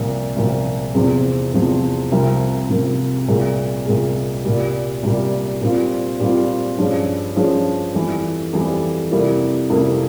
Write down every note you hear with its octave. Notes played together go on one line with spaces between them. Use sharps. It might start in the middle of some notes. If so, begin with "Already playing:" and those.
Already playing: C2 A#2 F3
C2 A#2 F3
E2 C3 F3 C4
E2 C3 F3 C4
C2 C3 F3 A#3
C2 C3 F3 A#3
C2 A#2 G#3
C2 A#2 G#3
C2 A#2 G3
C2 A#2 G3
A#2 G3 C4 F4
A#2 G3 C4 F4
G2 F3 G#3 C#4
G2 F3 G#3 C#4
F2 E3 G3
F2 E3 G3
F2 C3 G3 A#3 E4
F2 C3 G3 A#3 E4